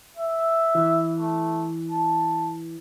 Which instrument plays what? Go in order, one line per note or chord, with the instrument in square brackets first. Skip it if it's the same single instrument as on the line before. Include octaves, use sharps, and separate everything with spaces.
[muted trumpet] E5
[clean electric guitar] E3
[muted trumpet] A3
A5